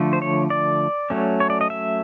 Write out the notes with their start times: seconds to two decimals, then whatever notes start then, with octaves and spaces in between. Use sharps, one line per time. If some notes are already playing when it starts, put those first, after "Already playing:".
Already playing: D3 F3 A3
0.13 C5
0.22 C#5
0.50 D5
1.10 F#3 A3 C#4
1.40 C#5
1.50 D5
1.61 D#5
1.70 E5